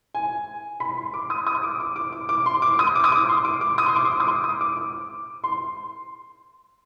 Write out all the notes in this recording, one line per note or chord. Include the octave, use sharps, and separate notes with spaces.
G#5
B5
C6
D6
D#6
D#6
D6
D6
D6
D6
D6
C6
D6
D#6
D6
D#6
D6
C6
D6
D6
D#6
C6
D6
C6
D6
D#6
D6
D#6
D6
D6
C6